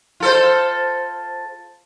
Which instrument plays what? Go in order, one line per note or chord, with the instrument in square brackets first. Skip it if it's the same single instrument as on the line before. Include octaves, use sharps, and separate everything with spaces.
[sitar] F4 A4 C5